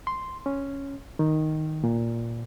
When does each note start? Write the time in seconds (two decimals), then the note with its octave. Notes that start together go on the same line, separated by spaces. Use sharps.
0.07 C6
0.46 C#4
1.19 D#3
1.84 A#2